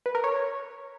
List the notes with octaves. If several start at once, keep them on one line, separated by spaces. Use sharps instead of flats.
B4
A#4
C#5